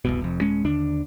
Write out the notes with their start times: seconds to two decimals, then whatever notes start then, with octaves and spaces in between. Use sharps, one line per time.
0.05 F1 C2 B2
0.21 F1 F2
0.41 D#1 G#3 C#4
0.64 D#2 D3 D4